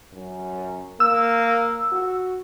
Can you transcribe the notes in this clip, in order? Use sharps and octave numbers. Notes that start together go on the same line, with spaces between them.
F#2
A#3 E6
F#4